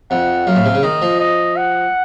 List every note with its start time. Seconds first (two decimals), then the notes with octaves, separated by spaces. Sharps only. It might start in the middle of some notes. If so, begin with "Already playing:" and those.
0.11 F2 F#5
0.47 F#2 F5
0.56 A2
0.65 C3
0.74 C#3
0.83 D#3 D#5
1.02 F3
1.20 D#5
1.56 F#5